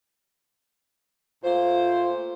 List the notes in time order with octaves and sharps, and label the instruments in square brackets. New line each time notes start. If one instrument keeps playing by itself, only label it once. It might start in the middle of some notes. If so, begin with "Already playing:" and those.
[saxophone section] A#2 A3 C5 [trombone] F4